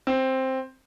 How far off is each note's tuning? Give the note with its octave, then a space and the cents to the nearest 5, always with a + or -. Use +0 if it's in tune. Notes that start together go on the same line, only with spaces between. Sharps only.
C4 +5